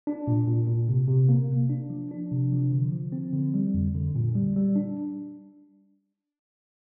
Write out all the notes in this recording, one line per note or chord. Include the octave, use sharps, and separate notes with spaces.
D4
A#2
A#2
A#2
C3
C3
A#3
C3
D4
F3
D4
C3
F3
D3
F3
C4
D3
G3
F2
D3
A#2
G3
G3
D4